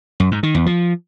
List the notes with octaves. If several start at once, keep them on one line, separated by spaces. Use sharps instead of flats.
F#2
G#2
D#3
E2
F3